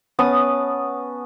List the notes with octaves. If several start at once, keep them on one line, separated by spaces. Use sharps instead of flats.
B3 C#4 A5 D#6